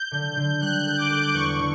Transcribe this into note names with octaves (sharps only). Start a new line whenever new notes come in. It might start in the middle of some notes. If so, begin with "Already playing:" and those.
Already playing: G6
D3
D3
G3 F#6
A4
D6
A4
E2 C#6
D3